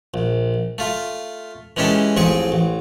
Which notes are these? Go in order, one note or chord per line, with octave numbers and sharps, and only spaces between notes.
A#1
A3 F4
E3 G#3 C#4 G4 A4
A1 F2 C4 G#4 C#6
A1